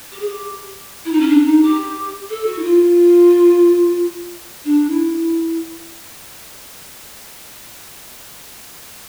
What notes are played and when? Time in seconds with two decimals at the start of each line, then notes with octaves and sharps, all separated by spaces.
0.12 G4
0.19 G#4
0.28 G4
1.05 E4
1.12 D#4
1.20 C#4
1.29 D4
1.46 D#4
1.62 G4
2.30 A4
2.46 F#4
2.58 E4
2.63 F4
4.65 D4
4.90 E4